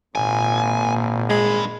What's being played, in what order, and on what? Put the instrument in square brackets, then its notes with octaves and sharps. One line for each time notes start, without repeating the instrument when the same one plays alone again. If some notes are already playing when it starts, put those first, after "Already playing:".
[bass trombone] G#1 [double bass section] A#2 [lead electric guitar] G#5
[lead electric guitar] G2 B5 [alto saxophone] G#3